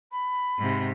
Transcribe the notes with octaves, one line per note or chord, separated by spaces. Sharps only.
B5
G#2 C3